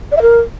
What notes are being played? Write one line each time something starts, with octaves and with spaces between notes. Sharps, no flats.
D5
E5
A#4